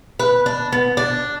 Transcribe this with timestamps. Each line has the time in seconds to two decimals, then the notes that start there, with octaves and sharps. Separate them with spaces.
0.19 B4
0.46 D4
0.72 B3
0.97 D4